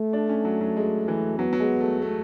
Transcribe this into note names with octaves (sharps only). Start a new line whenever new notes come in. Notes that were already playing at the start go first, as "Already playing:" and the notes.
Already playing: A3
D4
C#4
F#3
F#3
G#3
E3
F#3 B3
F#3
G#3
A3
A3